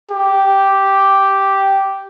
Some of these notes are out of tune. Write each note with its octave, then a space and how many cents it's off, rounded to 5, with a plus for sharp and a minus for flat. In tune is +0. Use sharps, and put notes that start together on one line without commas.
G4 -5